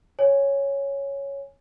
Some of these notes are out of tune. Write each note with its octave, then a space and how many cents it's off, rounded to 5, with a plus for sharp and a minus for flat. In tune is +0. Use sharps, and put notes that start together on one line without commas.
C#5 +0 G#5 +0